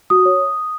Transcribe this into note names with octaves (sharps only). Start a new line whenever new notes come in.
F#4 D#6
C#5